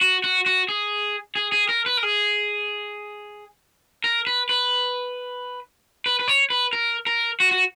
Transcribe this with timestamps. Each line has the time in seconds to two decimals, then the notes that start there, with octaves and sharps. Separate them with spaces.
0.01 F#4
0.24 F#4
0.46 F#4
0.69 G#4
1.36 G#4
1.52 G#4
1.69 A#4
1.86 B4
1.97 A#4
2.03 G#4
4.04 A#4
4.27 B4
4.49 B4
6.06 B4
6.20 B4
6.28 C#5
6.50 B4
6.73 A#4
7.07 A#4
7.40 F#4
7.51 F#4